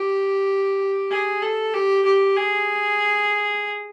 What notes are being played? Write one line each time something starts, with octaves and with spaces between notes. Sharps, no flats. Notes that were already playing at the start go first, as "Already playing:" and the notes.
Already playing: G4
G#4
A4
G4
G4
G#4